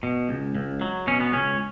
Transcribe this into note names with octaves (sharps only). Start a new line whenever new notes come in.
B2
C#2
C#2
F#3
B2 C#4
B3
C#2 C#4